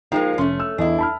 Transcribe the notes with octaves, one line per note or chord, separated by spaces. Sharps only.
F3 G#3 A#3 D#4 G5
F1 A3 C#4 C6
E6
E2 D4 E4 D#5
A5 B5 F6